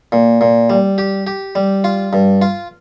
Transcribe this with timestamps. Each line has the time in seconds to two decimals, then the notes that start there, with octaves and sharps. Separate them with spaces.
0.12 A#2
0.41 A#2
0.70 G3
0.98 G4
1.27 G4
1.55 G3
1.84 F4
2.13 G2
2.42 F4